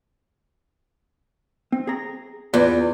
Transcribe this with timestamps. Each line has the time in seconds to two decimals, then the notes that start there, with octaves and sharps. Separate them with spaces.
1.72 C4
1.87 G#4 A#5
2.54 E2 F4 B4 D5